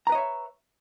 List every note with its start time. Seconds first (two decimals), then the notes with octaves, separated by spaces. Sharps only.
0.07 A#5
0.10 B4
0.12 D#5
0.15 C#5
0.18 E5